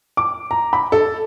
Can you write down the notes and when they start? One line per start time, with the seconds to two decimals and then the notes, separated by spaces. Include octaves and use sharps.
0.17 D6
0.51 A#5
0.73 B5
0.92 A4